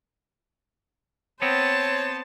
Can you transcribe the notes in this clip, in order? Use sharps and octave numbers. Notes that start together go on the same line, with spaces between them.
B3 C4 C5 C#5 A5